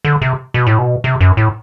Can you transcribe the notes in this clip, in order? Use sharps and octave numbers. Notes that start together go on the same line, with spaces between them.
D3
C3
B2
A2
B2
C3
F#2
A2